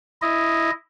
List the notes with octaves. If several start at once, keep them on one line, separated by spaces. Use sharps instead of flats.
E4 D#5